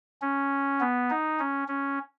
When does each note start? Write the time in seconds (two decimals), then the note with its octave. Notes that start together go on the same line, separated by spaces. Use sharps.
0.22 C#4
0.81 B3
1.10 D#4
1.40 C#4
1.68 C#4